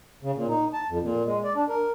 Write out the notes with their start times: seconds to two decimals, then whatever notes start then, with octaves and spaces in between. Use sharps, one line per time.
0.23 C#3
0.35 A#2
0.49 D#4
0.73 A5
0.89 F2
1.02 A#2
1.25 G#3
1.44 D5
1.56 D4
1.69 A#4